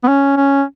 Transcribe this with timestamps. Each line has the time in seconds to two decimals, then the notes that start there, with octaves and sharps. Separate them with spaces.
0.04 B3
0.08 C#4
0.37 C#4